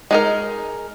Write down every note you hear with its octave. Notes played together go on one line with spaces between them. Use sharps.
G#3 D#4 A#4